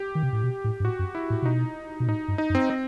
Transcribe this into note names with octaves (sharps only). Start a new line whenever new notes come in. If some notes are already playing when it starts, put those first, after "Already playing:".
Already playing: G4
D#3
C3
A2
B2
A2
G2
A2 F#4
F#2
E4
A2
C3
B2 D#4
B2
A2 D#4
G2
D#4
F#2
C4
C4